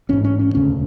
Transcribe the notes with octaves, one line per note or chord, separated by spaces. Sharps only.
A1 G#2 C#4
C#4
C#4
E1 D2 C#3 C#4